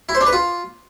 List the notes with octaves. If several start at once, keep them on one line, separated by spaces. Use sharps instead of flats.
E4
C5
D4
B4
F4